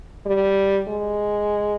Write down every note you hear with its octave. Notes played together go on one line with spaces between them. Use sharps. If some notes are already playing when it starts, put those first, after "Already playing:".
G3
G#3